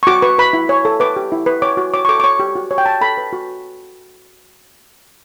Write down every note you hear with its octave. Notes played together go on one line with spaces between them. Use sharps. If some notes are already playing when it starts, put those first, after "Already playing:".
C#6
F#4 D6
B4 C#6
B4 B5
E4
C#5
A4
B4 D6
G4
E4
B4
C#5 D6
F#4
C#5 D6
C#6
A4 D6
D6
C#5 C#6
G4
F#4
C#5
G5
C#5 A5
A4 B5
B4
F#4